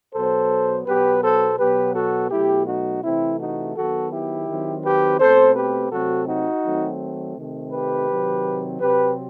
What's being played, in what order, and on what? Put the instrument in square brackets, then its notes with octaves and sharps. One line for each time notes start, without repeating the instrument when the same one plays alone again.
[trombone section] B2 F#3 B3 A4 C5
B2 F#3 B3 G4 B4
A4 C5
B2 F#3 B3 G4 B4
F#4 A4
B2 F#3 A3 E4 G4
D#4 F#4
C3 E3 A3 C4 E4
D#4 F#4
D#3 F#3 B3 F#4 A4
E4 G4
D#3 F#3 C4
G4 B4
B2 A3 C4 A4 C5
G4 B4
C3 F#3 A3 C4 F#4 A4
D#4 F#4
D#3 F#3 A3 C4
C3 D#3 A3 C4
G4 B4
C3 D#3 F#3 C4
C3 F#3 C4 G4 B4